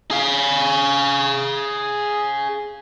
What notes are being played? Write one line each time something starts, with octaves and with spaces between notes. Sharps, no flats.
G#4 F5